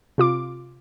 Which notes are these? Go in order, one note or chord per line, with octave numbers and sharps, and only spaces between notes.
C3 F4 D6